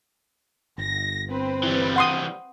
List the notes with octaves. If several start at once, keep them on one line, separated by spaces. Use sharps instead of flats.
G1 A#6
C4 B4
E3 G3
F#5 C6 D#6